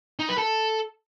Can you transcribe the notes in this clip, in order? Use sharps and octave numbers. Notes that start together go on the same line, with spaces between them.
D#4
B4
A4